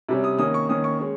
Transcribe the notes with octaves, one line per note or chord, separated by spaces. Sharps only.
C3 G3 C#4
D#6
D#3 A#3 C#4 D#6
C#6
D#3 A#3 C#4 D#6
C#6
G#3 C#4